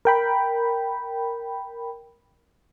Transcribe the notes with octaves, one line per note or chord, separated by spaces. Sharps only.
A#4 G5 B5